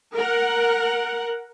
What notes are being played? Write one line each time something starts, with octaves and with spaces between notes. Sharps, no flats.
A#4 F#5